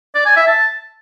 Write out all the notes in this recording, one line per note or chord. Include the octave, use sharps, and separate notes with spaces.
D5
G#5
E5
A5